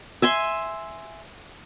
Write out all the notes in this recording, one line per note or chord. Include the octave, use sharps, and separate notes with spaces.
E5 G#5 C6